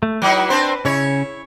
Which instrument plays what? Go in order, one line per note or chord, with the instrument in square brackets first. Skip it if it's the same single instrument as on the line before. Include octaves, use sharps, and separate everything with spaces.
[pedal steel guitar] A3
[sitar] F#3 D#4 E4 [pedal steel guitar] B4
[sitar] C4 D4 C5
[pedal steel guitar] C#3 C#4 [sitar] E4 C#5